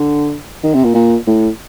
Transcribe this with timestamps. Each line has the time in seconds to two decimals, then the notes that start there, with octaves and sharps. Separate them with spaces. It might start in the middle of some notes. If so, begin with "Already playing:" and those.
Already playing: D3
0.63 D#3
0.74 C3
0.84 A#2
0.94 A#2
1.27 A2